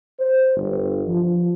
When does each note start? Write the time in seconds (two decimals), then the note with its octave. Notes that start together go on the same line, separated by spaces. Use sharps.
0.18 C5
0.55 G1
1.06 F3